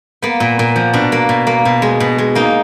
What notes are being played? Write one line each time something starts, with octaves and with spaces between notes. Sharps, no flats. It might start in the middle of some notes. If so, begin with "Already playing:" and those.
A#3 B3
A#2
A#2
F3
B2 D4
A#3
B2
A#3
B2
G#3
B2
G#3
A#3 D#4